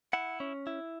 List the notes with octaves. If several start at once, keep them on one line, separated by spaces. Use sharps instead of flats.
E4 F#5
C#4
E4